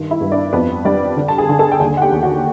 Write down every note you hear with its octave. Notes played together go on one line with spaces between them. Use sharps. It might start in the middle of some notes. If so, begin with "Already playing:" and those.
Already playing: G2 D#3
E4 E5
G2
D4 D5
F2 B3 B4
G3 D4 D5
D3
A5
G#4 G#5
D3 G#5
A4 A5
G5
D#2 G#4 G#5
F#5
G4 G5
D#2
F#4 F#5